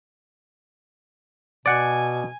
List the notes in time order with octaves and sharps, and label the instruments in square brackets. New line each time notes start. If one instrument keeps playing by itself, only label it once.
[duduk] B2 [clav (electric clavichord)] D5 F#5 [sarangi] G#5